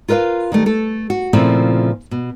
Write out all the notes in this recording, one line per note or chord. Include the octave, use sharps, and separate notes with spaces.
F4 A#4 B4 D#5 F5
D#3 G3 A3
A3 A4
F#4
A#2 C#3 F3 A3 C4 E4
B2